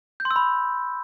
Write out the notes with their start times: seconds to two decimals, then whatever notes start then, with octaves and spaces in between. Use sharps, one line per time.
0.20 G6
0.25 C6
0.31 E6
0.36 B5